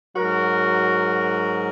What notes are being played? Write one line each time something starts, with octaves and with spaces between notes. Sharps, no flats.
G#2 F#3 F#4 A#4